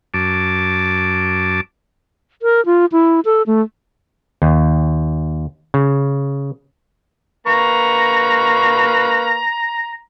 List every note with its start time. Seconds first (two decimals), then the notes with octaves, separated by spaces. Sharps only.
0.14 F#2 A5 D6
2.42 A#4
2.66 F4
2.92 E4
3.25 A4
3.47 A3
4.42 D#2
5.74 C#3
7.47 A#3 B4 A#5 C#6